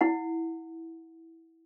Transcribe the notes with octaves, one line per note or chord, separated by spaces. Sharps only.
E4 F#5